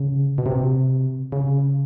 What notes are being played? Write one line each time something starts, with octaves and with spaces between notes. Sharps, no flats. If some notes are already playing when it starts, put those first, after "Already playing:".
Already playing: C#3
B2
C3
C#3